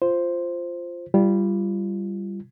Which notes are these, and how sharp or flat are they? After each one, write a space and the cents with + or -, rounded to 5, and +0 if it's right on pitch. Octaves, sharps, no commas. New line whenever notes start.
F4 -5 C5 +0
G3 +0 F4 -30